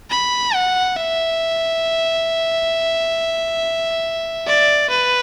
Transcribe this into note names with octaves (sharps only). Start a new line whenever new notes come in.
B5
F#5
E5
D5
B4